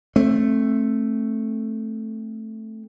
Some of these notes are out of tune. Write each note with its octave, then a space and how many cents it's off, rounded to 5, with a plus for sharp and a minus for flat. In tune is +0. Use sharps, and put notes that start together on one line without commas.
A3 +0 C4 +25